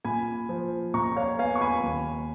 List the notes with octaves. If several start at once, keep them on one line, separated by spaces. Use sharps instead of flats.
A#2 G#5 B5
F3
A#2 A#5 C#6
C#5 F5
B3 F5 G#5
C#6
G#5 B5
D#2